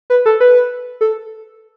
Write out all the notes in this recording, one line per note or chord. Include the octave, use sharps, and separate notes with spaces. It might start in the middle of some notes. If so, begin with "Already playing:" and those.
B4
A4
B4
A4